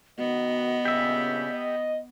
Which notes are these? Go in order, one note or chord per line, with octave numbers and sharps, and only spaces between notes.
D#3 B3 F#4 D#5
G2 A#2 C#3 G4 E5
D#5